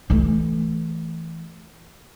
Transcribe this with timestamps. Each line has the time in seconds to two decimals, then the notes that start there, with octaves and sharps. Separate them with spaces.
0.10 E3 A3